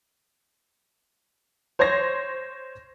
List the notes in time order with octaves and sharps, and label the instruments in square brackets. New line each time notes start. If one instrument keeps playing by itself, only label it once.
[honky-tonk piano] C5 C#5 C6 G#6 A#6